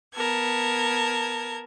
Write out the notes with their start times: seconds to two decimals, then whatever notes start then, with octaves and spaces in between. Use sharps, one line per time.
0.14 B3 A#4 A5 G#6